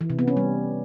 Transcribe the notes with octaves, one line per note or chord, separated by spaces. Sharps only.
E3
C3
B3
C#4
G3